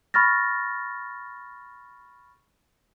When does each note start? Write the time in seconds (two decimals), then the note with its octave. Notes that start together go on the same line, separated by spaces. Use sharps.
0.14 B5 C#6 F6 A6 A#6